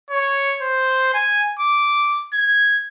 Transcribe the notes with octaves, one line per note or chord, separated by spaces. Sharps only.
C#5
C5
G#5
D6
G#6